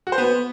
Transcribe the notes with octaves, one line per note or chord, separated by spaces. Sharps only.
F#4
C5
B3